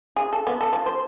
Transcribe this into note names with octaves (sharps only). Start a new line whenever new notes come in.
G#4
A4
B3
A4
F3
C5